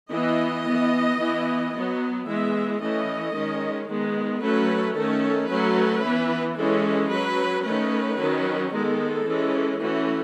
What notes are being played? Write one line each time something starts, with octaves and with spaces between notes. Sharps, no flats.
E3 B3 D#5
E3 B3
E3 B3
F#3 B3
E3 G#3 B3 E5
E3 A3 C#4 D#5
D#3 G#3 C#4
D#3 G#3 B3
F#3 A3 C#4 B4
D#3 A3 C#4 A4
F#3 A3 C#4 B4
E3 B3
E3 G#3 C#4 A4
F#3 C#4 B4
D#3 A3 C#4 B4
D#3 F#3 C#4
D#3 G#3 B3 A4
E3 G#3 C#4
E3 A3 C#4 F#4